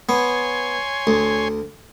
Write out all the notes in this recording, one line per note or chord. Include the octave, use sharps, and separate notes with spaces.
B3 C#5 G#5 C6
D2